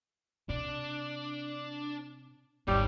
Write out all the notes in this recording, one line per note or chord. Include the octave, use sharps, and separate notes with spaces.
C3 D4
G#1 E2 G3 D#4 C#5